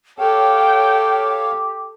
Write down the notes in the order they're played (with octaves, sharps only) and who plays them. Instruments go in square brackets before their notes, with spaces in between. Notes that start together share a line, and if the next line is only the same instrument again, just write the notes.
[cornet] G4 [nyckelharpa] A4 [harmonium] C#5 F5 [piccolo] G5